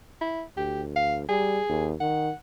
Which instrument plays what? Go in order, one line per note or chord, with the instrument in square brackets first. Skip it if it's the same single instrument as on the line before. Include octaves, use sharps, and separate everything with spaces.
[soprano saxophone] E4
[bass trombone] D2 [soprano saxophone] G4
[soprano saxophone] F5
[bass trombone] G3 [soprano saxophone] G#4
[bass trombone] D#2
[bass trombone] D#3 [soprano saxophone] F#5